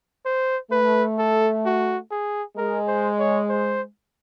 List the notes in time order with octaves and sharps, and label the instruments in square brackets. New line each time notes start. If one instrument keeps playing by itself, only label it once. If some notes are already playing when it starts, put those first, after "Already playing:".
[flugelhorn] C5
[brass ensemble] A3 [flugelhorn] B4
[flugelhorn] A4
F#4
G#4
[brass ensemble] G#3 [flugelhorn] A#4
[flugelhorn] C5
C#5
C5